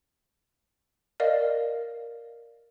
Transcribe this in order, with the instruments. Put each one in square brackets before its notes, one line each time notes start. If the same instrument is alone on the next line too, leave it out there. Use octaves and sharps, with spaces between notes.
[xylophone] A#4 D5 D#5 F5